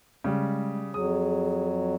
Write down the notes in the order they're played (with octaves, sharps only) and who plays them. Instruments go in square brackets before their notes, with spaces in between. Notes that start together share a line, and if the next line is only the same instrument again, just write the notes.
[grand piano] C#3 G3 [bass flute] G#3
[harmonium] F2 F#3 [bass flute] G#4 [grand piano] D#6